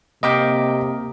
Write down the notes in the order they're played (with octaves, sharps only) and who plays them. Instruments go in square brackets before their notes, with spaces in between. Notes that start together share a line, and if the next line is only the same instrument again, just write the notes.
[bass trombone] C3 [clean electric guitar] A#3 G5 [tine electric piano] D#5 D6 B6